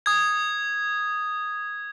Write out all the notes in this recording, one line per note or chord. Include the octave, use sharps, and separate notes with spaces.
D#6 G#6